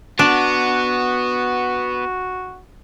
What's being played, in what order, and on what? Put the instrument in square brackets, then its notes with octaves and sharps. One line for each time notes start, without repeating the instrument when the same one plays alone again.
[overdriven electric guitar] B3 [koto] D4 [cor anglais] F#4